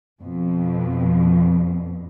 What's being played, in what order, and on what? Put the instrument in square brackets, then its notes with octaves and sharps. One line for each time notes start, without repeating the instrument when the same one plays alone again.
[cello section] F2 B2